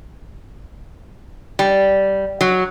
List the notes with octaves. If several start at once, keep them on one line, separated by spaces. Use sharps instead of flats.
G3
F#3